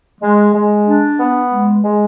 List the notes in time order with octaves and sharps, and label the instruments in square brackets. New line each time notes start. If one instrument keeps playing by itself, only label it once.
[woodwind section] G#3
G#3
D4
B3
G#3
G#3